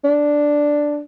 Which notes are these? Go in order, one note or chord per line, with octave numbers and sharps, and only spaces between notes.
D4